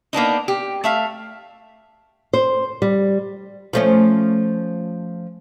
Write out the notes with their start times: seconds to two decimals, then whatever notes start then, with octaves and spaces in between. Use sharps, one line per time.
0.13 A#3 B3 D4 D#4
0.48 G4
0.84 A3 E5 F5
2.33 C5
2.82 G3
3.73 F3 A3 C#4